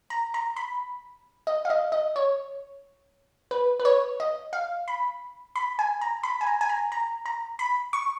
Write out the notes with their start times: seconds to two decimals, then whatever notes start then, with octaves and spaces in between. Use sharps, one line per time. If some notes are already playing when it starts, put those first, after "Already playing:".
0.10 A#5
0.34 A#5
0.56 B5
1.47 D#5
1.65 F5
1.70 D#5
1.92 D#5
2.16 C#5
3.51 B4
3.80 B4
3.85 C#5
4.20 D#5
4.53 F5
4.88 B5
5.56 B5
5.79 G#5
6.01 A#5
6.23 B5
6.41 G#5
6.47 A#5
6.61 G#5
6.69 A#5
6.92 A#5
7.26 A#5
7.59 B5
7.93 C#6